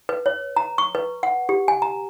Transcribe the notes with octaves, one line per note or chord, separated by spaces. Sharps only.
B4
C#5
A#5
C#6
B4
F#5
G4
G#5
A#5